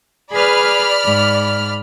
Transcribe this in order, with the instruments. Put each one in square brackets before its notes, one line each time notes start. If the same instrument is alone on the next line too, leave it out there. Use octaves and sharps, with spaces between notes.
[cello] G#4 B4 [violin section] D5 B5 F6
[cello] G#2